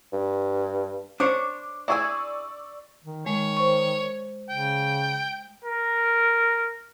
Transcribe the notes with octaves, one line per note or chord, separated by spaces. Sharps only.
G2
D4 C5 C#5 D6
E4 G#4 D5 G#5 C#6 E6
D#3
D#3 G#3 C#5
C5 C#6
C#3 G5
A#4